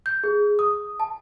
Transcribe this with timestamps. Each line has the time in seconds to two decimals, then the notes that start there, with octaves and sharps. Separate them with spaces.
0.06 G6
0.24 G#4
0.59 D#6
1.00 A5